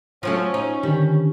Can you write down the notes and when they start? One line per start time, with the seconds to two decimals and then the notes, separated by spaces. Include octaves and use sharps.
0.23 F3 F#3 A3 C#4
0.54 D#4
0.83 D3 D#3 G3 D4